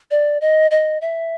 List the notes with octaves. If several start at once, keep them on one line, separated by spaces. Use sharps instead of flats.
D5
D#5
D#5
E5